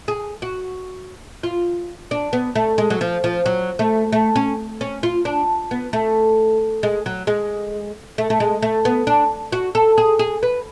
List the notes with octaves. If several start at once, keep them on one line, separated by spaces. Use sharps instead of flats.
G#4
F#4
F4
D4
B3
A3
G#3
F#3
F3
F3
F#3
A3
A3
C#4
C#4
F4
D4
B3
A3
G#3
F#3
G#3
A3
A3
G#3
A3
B3
D4
F#4
A4
G#4
G#4
B4